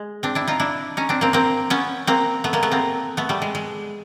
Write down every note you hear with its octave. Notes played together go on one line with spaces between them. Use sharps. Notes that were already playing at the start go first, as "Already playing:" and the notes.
Already playing: G#3
C4 D4
D4 E4
D#4 F4
D4 E4
C#4 D#4
C4 D4
A#3 C4
A#3 C4
B3 C#4
A#3 C4
A3 B3
G#3 A#3
A3 B3
A#3 C4
A3 B3
G3 A3
G#3
G#3